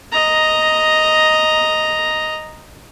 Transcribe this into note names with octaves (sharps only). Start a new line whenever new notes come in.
D#5 A#5